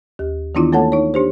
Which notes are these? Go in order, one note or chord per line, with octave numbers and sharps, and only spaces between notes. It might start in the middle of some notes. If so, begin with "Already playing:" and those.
D#2 G4
D#3 E3 B3 D4 E4 F4
A3 A#3 A4 C#5 F#5 A5
D#4 C#5
D4 G4 C5